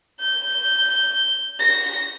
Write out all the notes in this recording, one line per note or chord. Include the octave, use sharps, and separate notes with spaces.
G6
A#6